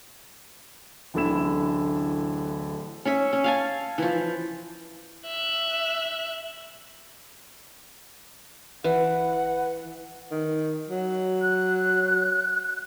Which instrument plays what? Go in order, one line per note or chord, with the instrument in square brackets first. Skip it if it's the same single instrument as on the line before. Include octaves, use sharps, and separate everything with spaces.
[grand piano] D1 A1 D3 E4 E7
[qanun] C#4 C#5 E5
C#4
F5 G#5 A5
E3 F3
[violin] E5 F#6
[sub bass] G1 [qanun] E3 [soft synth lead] B4 [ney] F#5
[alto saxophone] D#3
F#3
[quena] F#6
F#6